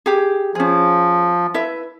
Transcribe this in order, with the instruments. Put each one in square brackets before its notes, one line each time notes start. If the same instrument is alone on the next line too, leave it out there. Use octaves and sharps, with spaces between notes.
[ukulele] G4 G#4
[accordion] F3 [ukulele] C#4 G#4
[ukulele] E4 B4 E5